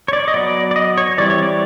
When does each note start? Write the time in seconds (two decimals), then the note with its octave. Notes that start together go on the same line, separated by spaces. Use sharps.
0.08 C#5
0.13 D5
0.28 D#5
0.34 F#3 B3 D5
0.71 D5
0.76 D#5
0.98 C#5
1.18 E3 G3 C4 D5
1.30 C#5
1.42 D5